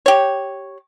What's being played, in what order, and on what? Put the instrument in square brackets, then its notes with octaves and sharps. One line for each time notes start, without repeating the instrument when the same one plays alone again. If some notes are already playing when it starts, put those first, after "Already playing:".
[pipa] G4 C#5